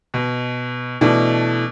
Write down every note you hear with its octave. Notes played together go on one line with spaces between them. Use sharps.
B2
B2 E3 A3 D4